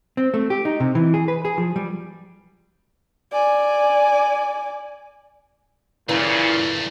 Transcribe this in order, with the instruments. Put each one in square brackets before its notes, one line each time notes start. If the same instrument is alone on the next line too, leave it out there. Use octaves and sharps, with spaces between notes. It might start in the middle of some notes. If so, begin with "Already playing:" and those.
[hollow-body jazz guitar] C4
A3
G4
D#4
C3
E3
G#4
B4
G#4
F3
G3
[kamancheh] D5 G#5
[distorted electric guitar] G2 A3 [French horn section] A#2 C#3 [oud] E3